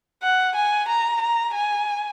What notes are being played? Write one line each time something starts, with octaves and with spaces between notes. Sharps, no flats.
F#5
G#5
A#5
A#5
G#5